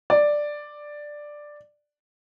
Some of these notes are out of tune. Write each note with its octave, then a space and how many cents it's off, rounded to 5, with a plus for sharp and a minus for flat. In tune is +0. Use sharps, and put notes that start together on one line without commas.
D5 +5